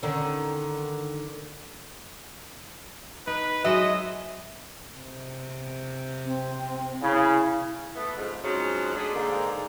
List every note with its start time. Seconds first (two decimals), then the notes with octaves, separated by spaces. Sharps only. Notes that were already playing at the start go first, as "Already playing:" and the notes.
0.03 D3 D#3 C#4
3.27 D#4 B4
3.64 F#3 G#3 F#4 D#5 E5
4.97 C3
6.25 C4
7.02 C#3 E4
7.95 A3 B3 E4
8.16 F2 G#2
8.44 G#2 F3 F#3 G#3 C4 C#4
8.94 G#3 A3 D4 G#4
9.14 G#2 D3 A#3